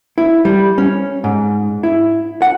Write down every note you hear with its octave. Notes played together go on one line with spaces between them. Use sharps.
E4
G3
C#4
G#2
E4
F#5